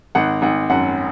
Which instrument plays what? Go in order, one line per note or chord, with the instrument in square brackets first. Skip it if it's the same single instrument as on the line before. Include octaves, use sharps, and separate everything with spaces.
[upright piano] G#1 F#5
G#1 F#5
F#2 F#5